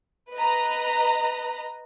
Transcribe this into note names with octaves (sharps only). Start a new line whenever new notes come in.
B4 D#5 A#5